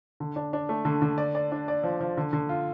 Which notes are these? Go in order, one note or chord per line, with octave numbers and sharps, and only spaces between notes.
D3
D4
D4
A3
D3
D3
D5
D5
D4
D5
F3
F3
D3
D3
F4